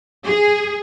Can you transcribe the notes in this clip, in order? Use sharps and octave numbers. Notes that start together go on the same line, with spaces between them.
G#4